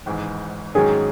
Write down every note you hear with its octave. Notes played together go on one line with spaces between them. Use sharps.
G#1 G#2 E3
G#2 D#3 F#3 C#4 G#4